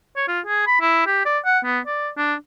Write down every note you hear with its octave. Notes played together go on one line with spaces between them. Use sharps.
C#5
F4
G#4
B5
E4
G4
D5
F#5
B3
D5
D4